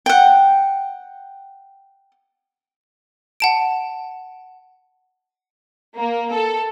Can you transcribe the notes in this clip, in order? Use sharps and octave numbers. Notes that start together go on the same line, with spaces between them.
F#5 G5
F#5 A5 D7
A#3
A4